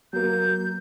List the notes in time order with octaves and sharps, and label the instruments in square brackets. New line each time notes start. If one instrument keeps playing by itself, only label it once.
[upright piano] F#3 A#3 [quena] G6